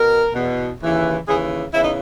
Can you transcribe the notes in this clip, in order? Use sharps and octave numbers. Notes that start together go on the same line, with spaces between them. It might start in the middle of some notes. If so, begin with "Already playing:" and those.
Already playing: B2 A#4
E2 B2
D#2 C#3 E3
D#2 C#3 E3 G#4
E2 C#3 E3 E4
D#4